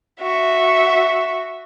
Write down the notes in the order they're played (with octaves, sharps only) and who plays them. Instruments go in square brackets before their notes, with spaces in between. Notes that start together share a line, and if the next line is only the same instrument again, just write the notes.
[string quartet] F#4 E5